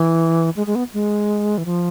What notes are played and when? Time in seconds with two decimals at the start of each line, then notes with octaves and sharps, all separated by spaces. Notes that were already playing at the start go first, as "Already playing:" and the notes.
Already playing: E3
0.56 G#3
0.67 G#3
0.75 B3
0.94 G#3
1.58 E3
1.65 F3